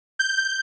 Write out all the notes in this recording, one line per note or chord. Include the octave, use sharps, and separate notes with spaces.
G6